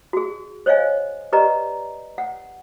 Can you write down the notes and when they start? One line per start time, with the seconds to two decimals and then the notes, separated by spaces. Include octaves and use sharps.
0.13 F#4 G#4
0.66 C5 C#5 D#5 F5 G#5
1.32 G4 B4 D5 D#5 A#5
2.18 F#5